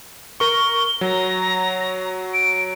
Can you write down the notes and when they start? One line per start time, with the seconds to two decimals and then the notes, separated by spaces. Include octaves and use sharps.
0.40 A#4 C#6 G7
1.01 F#3 A#5
2.34 D7